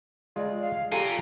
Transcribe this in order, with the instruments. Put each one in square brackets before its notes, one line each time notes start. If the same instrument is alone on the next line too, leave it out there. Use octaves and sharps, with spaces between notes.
[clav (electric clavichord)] G#3 F4 [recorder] D5
[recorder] F5
[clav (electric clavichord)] F4 G4 A4 [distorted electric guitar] F5 G#5 [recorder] A#5